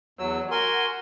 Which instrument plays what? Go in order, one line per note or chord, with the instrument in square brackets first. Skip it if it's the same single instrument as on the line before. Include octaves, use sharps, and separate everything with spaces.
[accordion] E2 E6 [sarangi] F#3
[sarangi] F#4 [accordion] A#4 G#5 C6